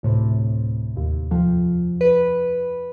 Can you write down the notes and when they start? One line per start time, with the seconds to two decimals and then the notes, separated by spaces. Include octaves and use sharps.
0.03 D2 A2 C3
0.96 D#2
1.31 F2 F3
2.01 B4